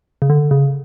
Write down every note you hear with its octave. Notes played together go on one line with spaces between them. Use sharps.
C#3
D3
C#3